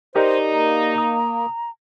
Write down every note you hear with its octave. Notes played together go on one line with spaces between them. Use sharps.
D#4 G4 A#4 C5 D5
A#3 A#5
D#6